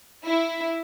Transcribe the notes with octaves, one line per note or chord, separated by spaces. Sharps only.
E4